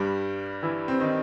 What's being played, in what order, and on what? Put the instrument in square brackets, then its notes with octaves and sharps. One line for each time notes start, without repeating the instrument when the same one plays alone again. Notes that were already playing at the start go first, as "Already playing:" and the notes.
Already playing: [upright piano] G2 G3
E3 E4
C4
D#3 D#4